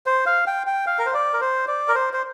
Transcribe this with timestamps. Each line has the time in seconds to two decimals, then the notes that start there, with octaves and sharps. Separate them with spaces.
0.06 C5
0.26 F5
0.47 G5
0.67 G5
0.87 F5
0.99 A#4
1.06 C5
1.14 D5
1.33 A#4
1.41 C5
1.68 D5
1.88 A#4
1.95 C5
2.13 C5